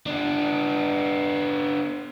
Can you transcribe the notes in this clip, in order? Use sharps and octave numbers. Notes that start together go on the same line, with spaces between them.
B3 D4